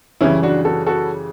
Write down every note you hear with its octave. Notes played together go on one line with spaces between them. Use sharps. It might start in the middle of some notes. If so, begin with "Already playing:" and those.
F#2 C#3 E3 G3 C#4 E4
D4 F#4
F#4 A4
F#4 A4